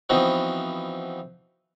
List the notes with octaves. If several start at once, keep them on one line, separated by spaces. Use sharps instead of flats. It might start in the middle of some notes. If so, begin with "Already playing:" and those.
E3 F3 B3 C4 D#4 F#4